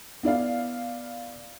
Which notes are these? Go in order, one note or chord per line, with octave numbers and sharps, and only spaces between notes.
B3 E4 D5 F5